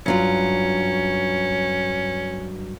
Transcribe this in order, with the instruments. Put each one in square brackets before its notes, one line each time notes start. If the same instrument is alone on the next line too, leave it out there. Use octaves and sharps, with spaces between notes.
[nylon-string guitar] G2 F#3 F4 [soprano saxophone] C#4